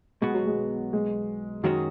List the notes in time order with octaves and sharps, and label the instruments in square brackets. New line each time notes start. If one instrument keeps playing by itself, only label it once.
[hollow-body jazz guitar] B1 B2 B3 F#4 [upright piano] G#3
[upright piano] F#3
G#3
G#3
[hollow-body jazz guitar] F#2 D#3 G#3 C#4 F#4 [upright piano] F#3